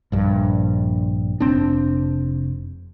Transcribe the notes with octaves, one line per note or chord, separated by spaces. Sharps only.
A#1 G2
F1 C4 D4